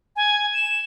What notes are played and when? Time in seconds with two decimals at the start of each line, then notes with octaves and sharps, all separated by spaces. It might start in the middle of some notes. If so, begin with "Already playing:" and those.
0.16 G#5
0.54 E7